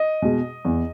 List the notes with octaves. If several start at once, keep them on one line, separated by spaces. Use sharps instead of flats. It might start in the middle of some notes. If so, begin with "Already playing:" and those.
Already playing: D#5
B2 G#3
E2